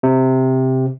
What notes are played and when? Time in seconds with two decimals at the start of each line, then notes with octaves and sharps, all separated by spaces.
0.03 C3